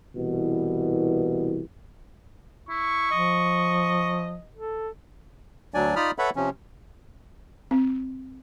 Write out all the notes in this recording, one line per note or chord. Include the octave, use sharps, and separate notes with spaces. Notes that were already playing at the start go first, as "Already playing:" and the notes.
C2 B2 E3
E4 C#6
F3 D#5
A4
D2 F#3 D4 D5 G#5
D#4 F4 D5 B5 D#6 F6
A4 B4 C#5 E5 F#5 B5
C3 F3 C#4
C4